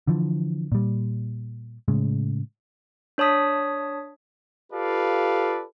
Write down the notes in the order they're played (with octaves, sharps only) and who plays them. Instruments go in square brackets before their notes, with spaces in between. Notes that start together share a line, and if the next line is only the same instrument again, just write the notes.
[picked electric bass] D3 E3 F3
A#2 G3
A2 C#3 G#3
[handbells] D4 C#5 A5 D#6 B6
[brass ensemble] F4 G4 A4 B4 D5 F5